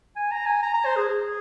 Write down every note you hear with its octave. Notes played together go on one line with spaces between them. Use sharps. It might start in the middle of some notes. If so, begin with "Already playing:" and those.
G#5
A#5
G#5
A#5
A#5
C5
G#4
G#4